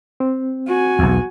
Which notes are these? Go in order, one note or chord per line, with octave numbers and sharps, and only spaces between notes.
C4
F#4 G#5
B1 E2